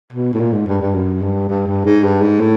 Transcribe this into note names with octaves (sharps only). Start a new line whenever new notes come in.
B2
A2
A#2
G#2
G2
G2
F#2
G2
G2
G2
G#2
G2
G#2
A2